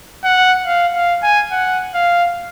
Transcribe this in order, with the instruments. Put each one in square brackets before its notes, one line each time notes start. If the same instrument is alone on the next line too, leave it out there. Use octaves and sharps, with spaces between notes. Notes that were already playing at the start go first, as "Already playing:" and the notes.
[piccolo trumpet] F#5
F5
F5
G#5
F#5
F5